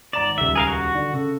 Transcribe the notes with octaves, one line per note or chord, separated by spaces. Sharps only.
G#1 D5 A#5 E7
D#1 C#2 E5
G#4 A#4 F5
F#4
D3
C#3 A4